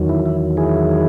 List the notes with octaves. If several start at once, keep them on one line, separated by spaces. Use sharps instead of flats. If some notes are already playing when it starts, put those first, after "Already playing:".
Already playing: E2 D#3 F#3
E4
E4
E4 G#4